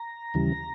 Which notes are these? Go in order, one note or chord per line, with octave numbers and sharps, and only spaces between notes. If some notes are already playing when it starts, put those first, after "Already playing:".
Already playing: A#5
D#2 C#3 E3 G3